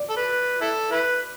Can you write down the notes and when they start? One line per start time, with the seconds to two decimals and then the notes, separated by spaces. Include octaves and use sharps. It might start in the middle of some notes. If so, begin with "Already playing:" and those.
Already playing: D5
0.10 A4
0.17 B4
0.61 E4 A4
0.91 E4 B4